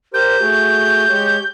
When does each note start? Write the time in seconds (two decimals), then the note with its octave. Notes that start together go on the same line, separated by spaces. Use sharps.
0.14 G4 A#4 C5 G6
0.41 A3 F#4 G#4
1.10 G#3 G4 C#5